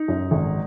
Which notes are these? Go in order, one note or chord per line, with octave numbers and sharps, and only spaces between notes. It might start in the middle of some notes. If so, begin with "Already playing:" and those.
Already playing: D#4
F#2
G#1